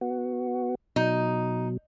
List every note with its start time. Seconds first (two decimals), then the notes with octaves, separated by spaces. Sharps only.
0.01 B3 F#4
0.96 B2 F#3 D#4